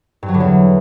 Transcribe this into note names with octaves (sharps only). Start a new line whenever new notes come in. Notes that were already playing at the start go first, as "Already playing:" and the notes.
G2
F#3
D3
E2